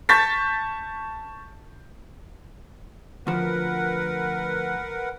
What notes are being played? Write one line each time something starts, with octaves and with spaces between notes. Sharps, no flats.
A5 C#6 G6 A6 B6
D2 F3 A#4 B4 F#5